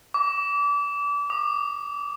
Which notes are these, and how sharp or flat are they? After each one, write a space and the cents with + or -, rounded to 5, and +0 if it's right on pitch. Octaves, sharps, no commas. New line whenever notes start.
D6 -30
D6 +35